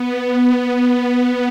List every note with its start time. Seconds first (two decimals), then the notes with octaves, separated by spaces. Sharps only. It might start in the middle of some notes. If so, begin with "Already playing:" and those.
Already playing: B3
0.13 B3
0.77 B3